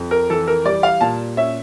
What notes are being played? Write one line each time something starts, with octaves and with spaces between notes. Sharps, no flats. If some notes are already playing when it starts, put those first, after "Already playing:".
Already playing: F2
A#4
E3 A4
A#4
G3 D5
F5
A#2 A5
C#4 E5